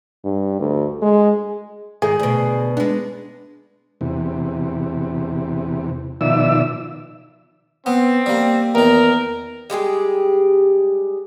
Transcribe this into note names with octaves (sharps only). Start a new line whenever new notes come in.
G2
D2
G#3
G#2 D#3 G#4
D2 B2
G#3 B3 D4
E2 C3
B2 D#3 F3 D5 E5 E6
B3 C4
G3 A#3
E2 D#3 A#4
G3 G#3 G4 G#4